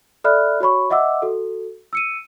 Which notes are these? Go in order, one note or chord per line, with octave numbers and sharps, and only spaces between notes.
A4 D5 E5 B5 F6 F#6
F#4 C#5 B5 C#6
D#5 E5 F#5 D6 E6
F#4 A4
E6 C#7 D#7